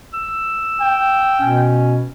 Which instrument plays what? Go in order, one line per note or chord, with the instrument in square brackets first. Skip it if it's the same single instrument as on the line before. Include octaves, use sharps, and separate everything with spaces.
[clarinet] E6
[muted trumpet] G5
[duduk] B2 [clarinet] C#4